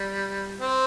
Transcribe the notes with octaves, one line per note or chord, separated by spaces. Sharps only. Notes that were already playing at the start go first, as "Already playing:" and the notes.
Already playing: G3
C4